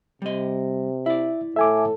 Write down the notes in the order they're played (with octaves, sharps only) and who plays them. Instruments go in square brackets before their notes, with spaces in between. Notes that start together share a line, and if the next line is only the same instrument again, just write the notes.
[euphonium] C3 [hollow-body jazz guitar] G3 D#5
[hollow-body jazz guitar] E4 D5 [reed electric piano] E5
[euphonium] A2 [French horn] A4 [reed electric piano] E5 G#5 D6